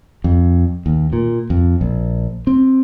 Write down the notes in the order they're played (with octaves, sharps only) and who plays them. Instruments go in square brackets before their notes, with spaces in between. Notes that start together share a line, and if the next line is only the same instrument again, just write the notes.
[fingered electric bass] F2
D#2
A#2
F2
A#1
C4